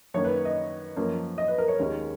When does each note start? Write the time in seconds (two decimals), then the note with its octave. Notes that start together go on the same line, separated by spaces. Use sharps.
0.14 F#2 D#3 A#3 C#5
0.25 B4
0.45 D#5
0.96 F#2 F3 A#3 C#4
1.38 D#5
1.48 B4
1.58 A#4
1.68 C#5
1.79 D#2 D#3 G#3 C#4